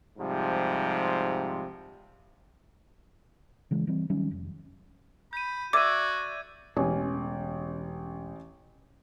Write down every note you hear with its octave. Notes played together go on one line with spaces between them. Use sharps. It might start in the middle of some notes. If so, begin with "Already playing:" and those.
G#2 C3 F3 G3
C#3 E3 G#3
E3 G3 C4
D#3 F#3 G3 C#4
F1
B5 G6 D#7
F#4 D5 E5 D6 G#6 D#7
E1 A1 C#4 G#5